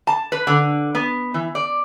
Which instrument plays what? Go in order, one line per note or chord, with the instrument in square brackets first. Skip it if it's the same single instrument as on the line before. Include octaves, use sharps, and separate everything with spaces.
[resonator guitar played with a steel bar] A5
B4
D3
B3
E3
D5